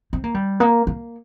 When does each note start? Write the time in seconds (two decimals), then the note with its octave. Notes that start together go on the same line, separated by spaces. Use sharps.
0.13 C4
0.24 A#3
0.34 G3
0.60 A#3
0.87 A#3